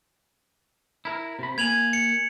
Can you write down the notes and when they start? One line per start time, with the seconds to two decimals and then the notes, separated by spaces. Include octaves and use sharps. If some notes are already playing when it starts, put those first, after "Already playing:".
1.05 E4 A#4
1.39 C3 B5
1.58 A#3 G#5 G#6 F7 F#7
1.93 C#7